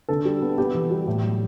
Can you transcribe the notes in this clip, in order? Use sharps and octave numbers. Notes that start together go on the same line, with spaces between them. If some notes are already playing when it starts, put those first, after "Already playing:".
D3 A4
G3
B3
B3 G4
E3
G3
A2
F#3